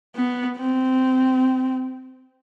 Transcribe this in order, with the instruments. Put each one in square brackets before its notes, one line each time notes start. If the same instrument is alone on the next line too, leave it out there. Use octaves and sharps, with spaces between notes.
[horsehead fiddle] B3
C4